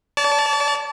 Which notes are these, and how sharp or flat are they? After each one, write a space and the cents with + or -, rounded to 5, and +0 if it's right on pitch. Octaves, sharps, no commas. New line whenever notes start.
D5 -40 A5 -5